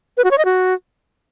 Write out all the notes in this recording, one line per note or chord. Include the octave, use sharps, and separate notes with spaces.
B4
F#4
C#5
D#5
F#4